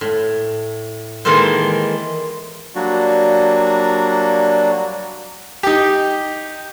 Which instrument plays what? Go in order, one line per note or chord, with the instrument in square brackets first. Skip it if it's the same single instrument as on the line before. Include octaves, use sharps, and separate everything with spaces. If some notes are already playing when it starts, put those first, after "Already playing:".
[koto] A2
D#3 E3 G#3 A#3 A4 C5
[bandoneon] F#3 G3 A#3 D4 F#4
[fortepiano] D#4 G4